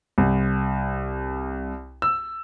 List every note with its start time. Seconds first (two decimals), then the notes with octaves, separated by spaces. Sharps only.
0.18 C2
2.02 E6